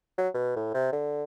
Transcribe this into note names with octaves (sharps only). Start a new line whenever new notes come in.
F#3
B2
A2
C3
D3